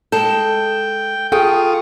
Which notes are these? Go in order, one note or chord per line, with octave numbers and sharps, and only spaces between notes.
G#3 A4 G5
F4 G#4 A4 G5 C#6 D#6